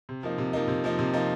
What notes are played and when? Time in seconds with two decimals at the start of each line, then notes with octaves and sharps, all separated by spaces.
0.09 C3
0.23 F3 A#3 D#4
0.38 C3
0.53 F3 A#3 D#4
0.68 C3
0.84 F3 A#3 D#4
0.99 C3
1.13 F3 A#3 D#4